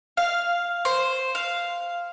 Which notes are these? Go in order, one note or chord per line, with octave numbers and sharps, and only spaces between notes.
F5
C5
F5